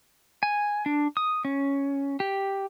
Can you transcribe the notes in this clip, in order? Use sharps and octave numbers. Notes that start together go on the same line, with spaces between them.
G#5
D4
D#6
C#4
G4